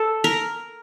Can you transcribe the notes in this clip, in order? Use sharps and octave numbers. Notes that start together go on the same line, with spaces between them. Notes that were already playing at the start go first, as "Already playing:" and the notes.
Already playing: A4
A#4